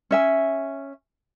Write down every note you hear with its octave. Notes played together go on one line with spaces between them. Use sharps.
C#4 E5 G#5